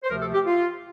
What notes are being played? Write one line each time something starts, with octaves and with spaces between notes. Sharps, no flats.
C5
D2 C3 F3 A3 A#4
A4
G4
F4